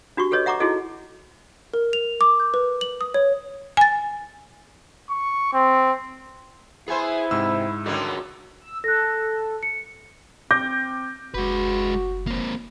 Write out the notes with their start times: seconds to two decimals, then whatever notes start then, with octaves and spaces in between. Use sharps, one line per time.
0.17 D4 F#4 G4 C#6
0.31 G4 A4 B4 C#5 D#5
0.46 E5 F#5 A#5 C#6 D6
0.60 D#4 E4 F#4 G#4 A4 D#5
1.74 A#4
1.93 F7
2.21 D6
2.40 G6
2.54 B4
2.81 F#7
3.01 D#6
3.14 C#5
3.77 G#5 A6
5.10 C#6
5.53 C4
6.88 B3 E4 G#4 C5 G#5
7.31 G#2 C3 E6
7.86 C#2 D3 D#3 G3 F#4 A#4
8.61 E6
8.84 A4 F#6 A#6
9.63 C#7
10.51 C4 D6 G6 A#6
11.34 F#1 G#3 F#4 B4
12.27 A#3 C4